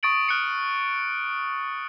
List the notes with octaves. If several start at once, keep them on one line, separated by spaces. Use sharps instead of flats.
C#6 D#6 A6 D7 F#7
F6 F#6 C#7